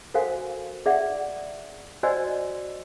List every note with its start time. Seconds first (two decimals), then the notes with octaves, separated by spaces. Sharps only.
0.14 F#4 A4 A#4 C5 F5 G#5
0.86 G#4 D5 E5 F#5
2.03 F#4 C5 D5 D#5 G#5 E6